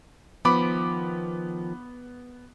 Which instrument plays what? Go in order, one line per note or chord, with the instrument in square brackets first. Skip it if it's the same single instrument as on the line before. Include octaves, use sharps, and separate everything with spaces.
[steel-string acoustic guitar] D#3 F3 [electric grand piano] B3 B5 D6